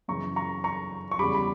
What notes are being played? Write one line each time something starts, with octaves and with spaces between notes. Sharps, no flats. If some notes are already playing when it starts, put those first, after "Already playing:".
F#2 C#3 E3 A#5 C#6
A#5 C#6
A#5 C#6
C#6
E2 C#3 G3 B5 D6
B5